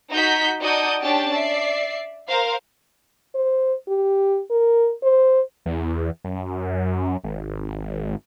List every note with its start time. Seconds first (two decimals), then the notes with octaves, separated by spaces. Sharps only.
0.12 D#4 F#4 G6 B6
0.62 D#4 F#4 D5 A5 D#6 G6
1.03 C#4 D4 G4 G5 A5
1.33 D5 E5 C7
2.28 A#4 C5 F5
3.35 C5
3.88 G4
4.50 A#4
5.03 C5
5.66 E2
6.24 F#2
7.24 G#1